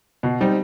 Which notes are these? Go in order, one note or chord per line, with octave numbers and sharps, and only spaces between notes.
B2
G3 C4 D#4